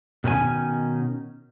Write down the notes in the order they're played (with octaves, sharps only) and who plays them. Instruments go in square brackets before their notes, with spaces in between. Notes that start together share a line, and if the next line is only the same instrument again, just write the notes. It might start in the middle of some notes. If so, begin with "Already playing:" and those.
[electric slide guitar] B2 D#3 C#4 G#5